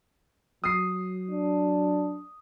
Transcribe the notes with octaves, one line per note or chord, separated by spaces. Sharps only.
F#3 D#6 C7
D4